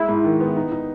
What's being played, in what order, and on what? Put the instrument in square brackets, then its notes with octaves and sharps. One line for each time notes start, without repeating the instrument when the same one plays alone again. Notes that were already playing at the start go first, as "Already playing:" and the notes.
Already playing: [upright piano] G#3 [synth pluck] E4
[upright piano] G#2
D#3
B3
D#4
D#4